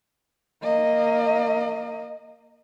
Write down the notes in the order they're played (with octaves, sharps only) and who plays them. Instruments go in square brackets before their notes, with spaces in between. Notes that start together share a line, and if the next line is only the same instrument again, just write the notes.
[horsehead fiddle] A#3 D#5